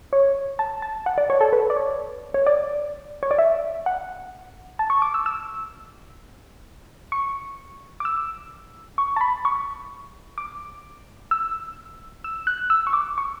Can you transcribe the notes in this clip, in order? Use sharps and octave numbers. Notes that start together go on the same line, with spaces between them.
C#5
A5
A5
F#5
D5
C#5
A4
B4
D5
C#5
C#5
D5
C#5
D5
E5
F#5
A5
C#6
D6
E6
E6
C#6
D6
E6
C#6
A5
B5
C#6
D6
E6
E6
F#6
E6
C#6
D6
C#6